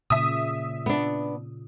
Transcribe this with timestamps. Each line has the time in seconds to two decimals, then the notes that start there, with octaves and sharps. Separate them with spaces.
0.10 A#2 C#3 E5 D#6
0.86 B3 D4